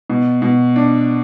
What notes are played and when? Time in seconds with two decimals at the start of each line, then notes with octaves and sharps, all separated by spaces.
0.10 B2
0.42 B2
0.76 D4